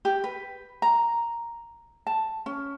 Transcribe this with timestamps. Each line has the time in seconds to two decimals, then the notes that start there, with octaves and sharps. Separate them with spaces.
0.05 G4
0.24 B4
0.82 A#5
2.07 A5
2.46 C#4